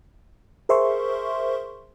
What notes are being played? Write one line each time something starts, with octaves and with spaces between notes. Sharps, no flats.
G#4 A#4 C5 E5 C6 C#6